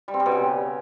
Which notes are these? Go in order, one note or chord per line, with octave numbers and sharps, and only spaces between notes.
G3
C4
G3
B2
C#3